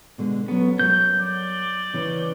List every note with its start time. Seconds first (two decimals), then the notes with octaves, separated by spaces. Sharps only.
0.18 B2 D3 G#3
0.48 F#3 B3 C#4 A4
0.79 F#3 A#4 C#5 G6
1.20 D5
1.94 C#3 E3 C#4